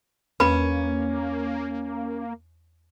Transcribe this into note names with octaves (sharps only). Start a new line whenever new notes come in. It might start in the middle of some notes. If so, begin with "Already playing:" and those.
E2 A#3 C#4 B4 B5